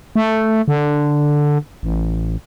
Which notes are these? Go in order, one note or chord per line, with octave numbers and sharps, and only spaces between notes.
A3
D3
A1